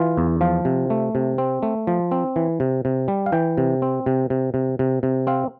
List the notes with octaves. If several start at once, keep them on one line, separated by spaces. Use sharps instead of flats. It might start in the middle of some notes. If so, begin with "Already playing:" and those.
Already playing: E3 F4
E2
F3 F4
C3
A3
C3
C4
A3
F3
C4
E3
C3
C3
G3
F5
E3 G5
C3
C4
C3
C3
C3
C3
C3
C4 F5